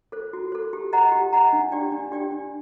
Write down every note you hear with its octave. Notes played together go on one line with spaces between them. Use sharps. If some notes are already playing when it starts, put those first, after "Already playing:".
A4 C5
F#4
A4 C5
G4
C5 D#5 F#5 A#5
G4
C5 D#5 F#5 A#5
D4
G4 D5 G5
D4
G4 D5 G5
D4